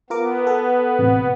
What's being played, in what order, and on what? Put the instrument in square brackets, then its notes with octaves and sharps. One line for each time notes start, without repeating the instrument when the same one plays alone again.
[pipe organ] B3 [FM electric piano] F4 A#4 D6
[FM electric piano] A4
A1 C3